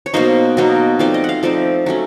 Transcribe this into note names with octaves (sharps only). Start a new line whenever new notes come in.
C#5
B2 F#3 A#3 D#4 C5
B2 F#3 A#3 D#4
F3 A3 C4 D#4 D5
D#5
F5 F#5
F3 A3 C4 D#4 D5
F#3 A3 C#4